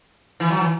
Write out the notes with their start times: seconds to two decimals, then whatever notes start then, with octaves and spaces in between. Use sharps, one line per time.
0.40 E3
0.51 F#3
0.61 E3